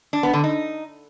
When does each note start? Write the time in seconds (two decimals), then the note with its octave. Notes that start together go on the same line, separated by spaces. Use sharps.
0.13 D4
0.23 B3
0.33 D3
0.44 D#4